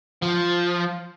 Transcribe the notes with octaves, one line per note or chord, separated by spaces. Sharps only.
F3